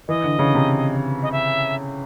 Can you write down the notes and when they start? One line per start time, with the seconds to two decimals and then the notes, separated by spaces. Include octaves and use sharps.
0.08 E3 D#5
0.24 D3
0.39 C#3
0.54 C3
1.23 D#5
1.32 E5